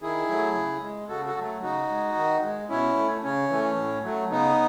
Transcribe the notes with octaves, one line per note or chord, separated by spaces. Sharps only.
D#3 E4 G#4
F#3 A3
C#3
G#3
C#3 F#4 A4
F#4 A4
F#3 A3
C#3 D#4 F#4
G#3
D#3
G#3
B2 C#4 E4
A3
C#3 C#4
E3 A3
A2
F#3 A3
C#3 B3 D#4